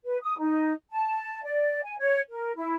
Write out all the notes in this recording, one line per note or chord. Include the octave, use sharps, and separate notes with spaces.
B4
D#6
D#4
A5
D5
G#5
C#5
A#4
E4